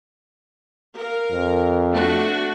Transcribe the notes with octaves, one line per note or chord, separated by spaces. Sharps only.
A#4 F5
F2
A3 D4 F#4